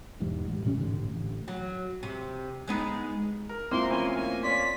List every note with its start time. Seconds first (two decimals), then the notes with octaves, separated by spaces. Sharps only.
0.20 E1 E2 G#2 G3
0.48 A1
0.65 A2 C3 C4 C#4
0.78 A1 G#2 D3 D4
1.14 A1
1.48 F#3
2.03 C3
2.68 G#3 B3 D#4
3.49 A#4
3.71 C#2 A#3 C4 E4 F4 C6
3.90 D2 E3 C#4 G#5
4.15 G#5
4.43 C#5 D5 C6 B6